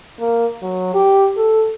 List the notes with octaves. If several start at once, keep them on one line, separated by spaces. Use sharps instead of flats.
A#3
F#3
G4
A4